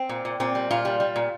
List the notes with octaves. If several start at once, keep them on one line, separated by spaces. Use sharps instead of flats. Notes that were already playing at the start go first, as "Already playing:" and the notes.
Already playing: C4
A#2
A#2
A#2 C4
G3
A#2 F4
G3
G3
A#2